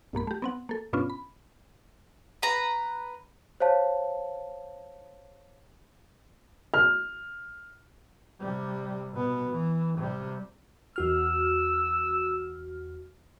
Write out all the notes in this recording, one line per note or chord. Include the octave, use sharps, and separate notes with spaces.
B1 G2 A#3 B5
A3 G4
B3 C4 F#5
A#3 A4
G2 B2 B3 C#4 D4 F4
B5
B4 A#5
C5 C#5 F5 A5
F6
C3 G3
B2 B3
E3
C3 G3
E2 F#4 E6 F6